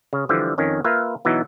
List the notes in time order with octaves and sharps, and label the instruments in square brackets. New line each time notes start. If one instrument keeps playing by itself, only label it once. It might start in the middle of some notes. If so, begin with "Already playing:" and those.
[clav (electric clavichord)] C#3
D3 E3 F3 G3
F2 D#3 C#4
A#3 F4 B4 E5 F5
B2 E3 F#3 B3 D#4